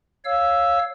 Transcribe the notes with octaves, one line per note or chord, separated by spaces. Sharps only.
C#5 F5 E6